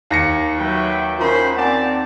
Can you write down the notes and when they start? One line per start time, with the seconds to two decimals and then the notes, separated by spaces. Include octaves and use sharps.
0.10 D#2 A#6 C#7
0.58 F#3 B4 E5 G5
1.19 D#3 C#4 F4 C5 A#5 B5
1.56 C4 D5 F#5 G#5 A5